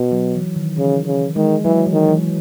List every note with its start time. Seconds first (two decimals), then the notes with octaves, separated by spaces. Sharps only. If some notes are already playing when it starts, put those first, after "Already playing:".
Already playing: B2
0.12 F#3
0.35 E3
0.56 D#3
0.78 C#3 E3
1.06 C#3
1.36 D#3 G#3
1.64 E3 F#3
1.86 E3
1.93 D#3
2.09 E3